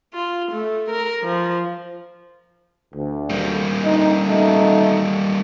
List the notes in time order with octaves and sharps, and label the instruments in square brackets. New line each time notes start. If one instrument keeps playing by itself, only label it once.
[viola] F4
A3
A#4
F3
[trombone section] D2
[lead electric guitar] G3 A#3
[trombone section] D2 D#4
B2 A3 D#4